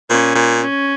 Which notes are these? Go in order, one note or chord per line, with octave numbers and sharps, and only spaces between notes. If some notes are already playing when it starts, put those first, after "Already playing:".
A#2 C#4
A#2
C#4